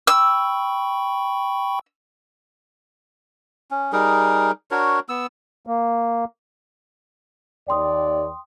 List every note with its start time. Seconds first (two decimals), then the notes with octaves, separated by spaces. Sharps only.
0.07 G5 B5 C#6 E6
3.71 C#4
3.93 G3 D#4 G#4 A#4
4.71 D4 F#4 A#4 C#5
5.09 B3 E6
5.67 A#3
7.68 D#2 D5 G5 C6 D#6